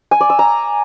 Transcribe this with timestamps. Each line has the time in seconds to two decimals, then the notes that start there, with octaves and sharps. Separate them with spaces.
0.11 G#5
0.21 D5
0.30 E6
0.39 A#5